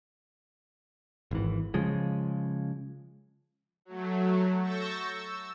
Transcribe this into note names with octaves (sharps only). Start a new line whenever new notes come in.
G#1 E3
C#3 F3 G#3
F#3 A3
C#6 E6 G6 A6 A#6
E6